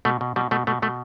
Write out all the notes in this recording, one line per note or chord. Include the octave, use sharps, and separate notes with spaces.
B2 A3
B2
B2 G3
B2 A3
B2 A3
B2 A3